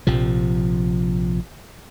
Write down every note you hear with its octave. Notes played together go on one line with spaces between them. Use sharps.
A#1 C3 F3